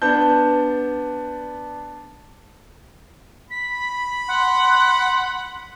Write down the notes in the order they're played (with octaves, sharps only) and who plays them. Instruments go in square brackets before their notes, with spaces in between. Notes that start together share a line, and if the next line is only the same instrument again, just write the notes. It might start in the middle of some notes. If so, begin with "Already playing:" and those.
[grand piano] B3 D4 A5 G6
[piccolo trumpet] B5 [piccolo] B6
[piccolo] F#5 [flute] C6